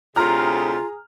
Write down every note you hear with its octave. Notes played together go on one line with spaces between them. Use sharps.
D2 A2 C3 F4 G#4 A#5 F6